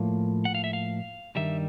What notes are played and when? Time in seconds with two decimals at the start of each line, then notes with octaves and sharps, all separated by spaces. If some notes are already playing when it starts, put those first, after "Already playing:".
Already playing: A2 F3 A#3
0.45 F#5
0.55 F5
0.64 E5
0.73 F5
1.36 G2 D#3 G3 E5